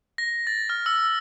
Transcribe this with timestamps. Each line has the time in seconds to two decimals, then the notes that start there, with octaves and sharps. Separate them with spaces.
0.18 A#6
0.47 A6
0.70 F6
0.86 E6